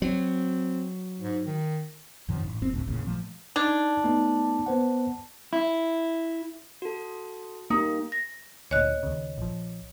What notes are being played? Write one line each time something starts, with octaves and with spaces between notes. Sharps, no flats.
F#3 C4
G#2
D#3
F#2 C3 D#3 F3
A1
F1 F#2 C4
A1 D2 A2 C3
A1 E2 A#2 C#3
A#2 F3 A3
D4 D#4 G#6
A3 B3 D#4
B3 C5 F#5
E4
F#4 A4
A#3 D#4 G4
A#6
D2 A#2 C#5 D#5 F#6
D#2 C#3
A#1 F3